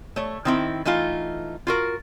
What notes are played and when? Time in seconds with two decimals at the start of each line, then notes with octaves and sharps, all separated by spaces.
0.16 A3 C#5
0.45 D#3 C4 E4
0.85 E3 A3 D#4 F4
1.67 F4 F#4 A#4